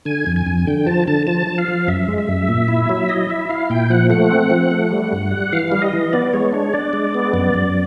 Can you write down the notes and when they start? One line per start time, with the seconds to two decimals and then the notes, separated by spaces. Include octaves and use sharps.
0.05 D3 G#5
0.27 F2
0.36 G#5
0.46 F2
0.67 D3 G5
0.86 F3 A5
1.07 D3 A5
1.27 F3 A5
1.47 F3
1.58 F5
1.68 F3
1.88 F#2 E5
2.08 G#3
2.18 E5
2.28 F#2
2.48 A#2
2.68 E4
2.89 F#3
3.09 E4 D#5
3.29 E4 E5
3.49 E4 F5
3.70 A#2 G5
3.90 F3 F#5
4.10 A3 F#5
4.31 C4
4.50 F3
4.71 A3
4.91 G3
5.12 G2
5.31 G3
5.53 E3 F5
5.72 G3
5.82 D#5
5.93 E3
6.13 B3 D5
6.33 G#3 C#5
6.53 D4 C#5
6.73 D4 D5
6.93 G#3
7.14 B3
7.34 F#2
7.54 F#2